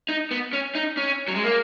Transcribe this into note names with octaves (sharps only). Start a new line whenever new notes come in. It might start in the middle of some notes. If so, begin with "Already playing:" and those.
D#4
B3
C#4
D#4
C#4
F#3
G#3
A#3